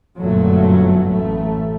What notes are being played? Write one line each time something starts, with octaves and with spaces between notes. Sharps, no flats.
G1 F#2 A#2 F#3 A3
A1 A3